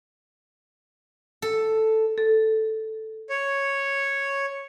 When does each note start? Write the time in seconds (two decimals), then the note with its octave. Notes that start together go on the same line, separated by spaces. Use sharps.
1.42 A4
2.18 A4
3.29 C#5